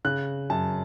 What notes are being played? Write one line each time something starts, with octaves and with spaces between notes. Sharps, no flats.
C#3 F#6
F#2 A5